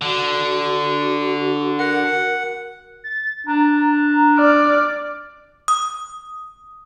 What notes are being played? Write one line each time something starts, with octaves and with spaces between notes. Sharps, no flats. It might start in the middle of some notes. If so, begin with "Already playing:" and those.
D3 F#4
A#4 F#5
A6
D4 A#5
D5 F6
D#6